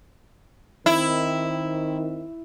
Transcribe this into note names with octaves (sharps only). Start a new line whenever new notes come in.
D#3 C4 E4